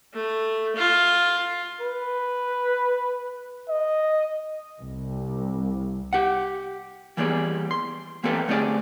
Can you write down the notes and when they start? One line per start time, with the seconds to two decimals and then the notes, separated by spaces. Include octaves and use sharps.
0.14 A3
0.76 F4
1.81 B4
3.69 D#5
4.82 C2
6.13 G4 F#5
7.17 E3 G3 A#3 B3 G#4 D5
7.71 C6
8.23 E3 A#3 C4 G4 A4 B4
8.48 D3 A3 C4 G4 G#4 D5